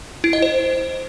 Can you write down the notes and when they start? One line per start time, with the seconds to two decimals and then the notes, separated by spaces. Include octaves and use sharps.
0.24 E4
0.33 D#5
0.42 C5